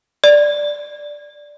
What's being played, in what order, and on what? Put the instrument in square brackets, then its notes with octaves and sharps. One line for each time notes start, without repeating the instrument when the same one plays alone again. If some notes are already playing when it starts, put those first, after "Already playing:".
[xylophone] D5